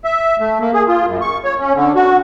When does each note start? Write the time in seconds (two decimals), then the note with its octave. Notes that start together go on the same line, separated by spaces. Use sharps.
0.05 E5
0.40 A3
0.60 A#3
0.74 G#4
0.88 F4
1.06 F#2
1.21 C#6
1.45 C#5
1.60 C#4
1.75 D3
1.96 F#4